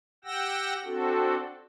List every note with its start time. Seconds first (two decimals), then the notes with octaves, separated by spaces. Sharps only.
0.24 G4 F#5 G5 E6 A#6
0.85 C4 D4 F#4 A4